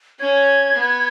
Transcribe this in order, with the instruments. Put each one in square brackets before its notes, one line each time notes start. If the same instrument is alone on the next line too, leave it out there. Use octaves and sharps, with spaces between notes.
[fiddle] C#4 [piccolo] G#6
[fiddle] B3